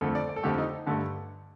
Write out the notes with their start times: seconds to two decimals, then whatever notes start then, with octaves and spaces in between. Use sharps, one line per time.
0.01 F2 D3 A3 A4
0.15 D5
0.29 D5
0.36 A4
0.43 F2 D3 A3 G4
0.58 D#4
0.86 G2 D3 A3